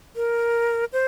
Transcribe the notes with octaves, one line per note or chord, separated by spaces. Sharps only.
A#4
C5